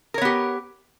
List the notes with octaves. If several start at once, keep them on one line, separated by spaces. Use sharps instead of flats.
B3 G4 A#4 C#5